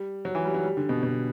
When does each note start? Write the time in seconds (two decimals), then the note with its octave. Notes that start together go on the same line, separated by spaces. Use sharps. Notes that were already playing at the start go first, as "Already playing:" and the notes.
Already playing: G3
0.25 F#3
0.35 E3
0.45 G3
0.54 F#3
0.64 G3
0.77 D3
0.89 B2
1.03 B2